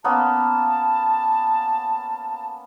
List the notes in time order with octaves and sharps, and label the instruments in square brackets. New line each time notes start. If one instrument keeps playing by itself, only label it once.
[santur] A#3 B3 C#4 [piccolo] A5